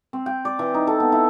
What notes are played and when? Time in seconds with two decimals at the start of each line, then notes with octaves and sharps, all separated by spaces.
0.13 C4
0.26 G5
0.45 D5
0.59 E3
0.74 D#4
0.87 A4
1.00 B3
1.12 E4